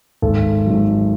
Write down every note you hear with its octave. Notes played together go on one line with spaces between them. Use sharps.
G#1 A4
G#2 F#3